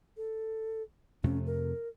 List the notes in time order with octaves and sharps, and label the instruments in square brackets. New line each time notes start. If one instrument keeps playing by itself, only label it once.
[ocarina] A4
[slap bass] F2 C3 A3 [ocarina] C#4
[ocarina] A#4